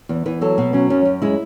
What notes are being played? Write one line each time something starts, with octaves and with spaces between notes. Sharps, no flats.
E2
E2 B4
F#3 A4
B2 B3
F#3 C#4
F#2 C#4
F#2
G#3 E4